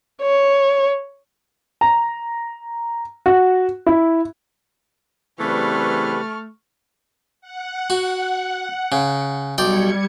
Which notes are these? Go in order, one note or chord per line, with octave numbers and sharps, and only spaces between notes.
C#5
A#5
F#4
E4
C#3 E3 G3 A3 C4 B4 C#6 F6
F#5
F#4
C#3
B1 G3 D5 G5 G#6 C#7